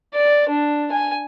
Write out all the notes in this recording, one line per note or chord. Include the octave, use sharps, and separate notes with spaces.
D5
D4
G#5